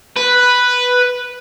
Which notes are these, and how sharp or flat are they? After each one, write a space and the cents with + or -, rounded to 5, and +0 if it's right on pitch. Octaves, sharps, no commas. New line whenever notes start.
B4 +0